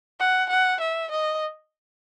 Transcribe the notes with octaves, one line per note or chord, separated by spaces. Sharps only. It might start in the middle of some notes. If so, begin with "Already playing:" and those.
F#5
F#5
E5
D#5